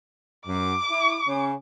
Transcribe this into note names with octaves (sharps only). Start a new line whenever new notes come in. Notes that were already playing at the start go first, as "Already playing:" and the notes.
F#2 D6
E4
C#3 C#4